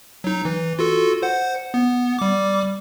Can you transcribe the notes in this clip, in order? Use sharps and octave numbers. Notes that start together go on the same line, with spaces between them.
F#3 D#4
E3
F4 F#4 A4
C5 F#5
B3
G3 D6